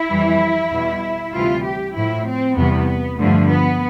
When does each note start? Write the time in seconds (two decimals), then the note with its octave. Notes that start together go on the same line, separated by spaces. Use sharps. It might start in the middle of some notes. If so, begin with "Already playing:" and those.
Already playing: E4
0.10 F2 E3 G3
0.72 E2 B2 G3
1.34 D2 C3 E3 G3 F4
1.65 G4
1.96 A2 F3 E4
2.27 C4
2.58 E2 C3 E3 G3 B3
3.20 G2 D3 F3 A3
3.51 B3